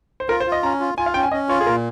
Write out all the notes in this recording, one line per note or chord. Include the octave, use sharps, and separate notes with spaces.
C5
F4 A#4
C5
F4
D#5
C#4 A#5
F4
F4 G#5
F5
C#4 G5
G#5
C#4 D#5
F4 C#5
G#4
A#2 A#4